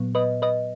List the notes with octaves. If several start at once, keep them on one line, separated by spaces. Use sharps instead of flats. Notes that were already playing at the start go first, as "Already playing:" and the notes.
Already playing: A#2 F#3 B3
B4 D#5
B4 D#5